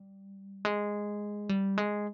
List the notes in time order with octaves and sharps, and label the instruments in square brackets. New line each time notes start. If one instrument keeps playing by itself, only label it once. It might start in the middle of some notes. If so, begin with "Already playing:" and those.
Already playing: [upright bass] G3
G#3
G3
G#3